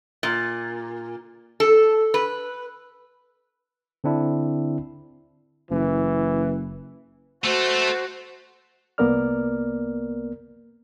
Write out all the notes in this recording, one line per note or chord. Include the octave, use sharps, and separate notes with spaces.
A#2
A4
B4
D3 C4 D4 E4
F#1 E3
A3 F#4 A4 C5
C2 A#3 B3 A#4 D5 F6